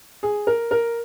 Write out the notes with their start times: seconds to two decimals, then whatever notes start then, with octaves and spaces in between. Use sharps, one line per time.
0.23 G#4
0.47 A#4
0.71 A#4